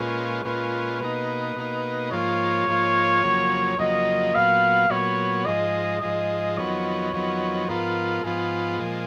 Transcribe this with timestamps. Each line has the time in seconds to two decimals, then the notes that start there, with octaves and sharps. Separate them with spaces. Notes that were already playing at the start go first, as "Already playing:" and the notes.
Already playing: A#2 G#3 C#4 F4 B4
0.45 A#2 G#3 C#4 F4 B4
1.00 B2 A#3 D#4 B4
1.56 B2 A#3 D#4
2.11 G#2 F3 A#3 F4 C#5
2.67 G#2 F3 A#3 F4
3.23 F2 C#3 F#3 A#3
3.78 F2 C#3 F#3 A#3 D#5
4.35 A#2 F#3 B3 F5
4.90 A#2 F#3 B3 C#5
5.45 G#2 F3 G#3 D#5
6.01 G#2 F3 G#3 D#5
6.57 F2 D#3 F#3 B3 C#5
7.13 F2 D#3 F#3 B3
7.68 G#2 F3 B3 F4 A#4
8.24 G#2 F3 B3 F4 G#4
8.80 A#2 F3 G#3